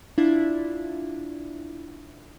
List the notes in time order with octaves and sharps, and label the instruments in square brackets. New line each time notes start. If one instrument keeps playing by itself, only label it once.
[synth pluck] D4 E4 F4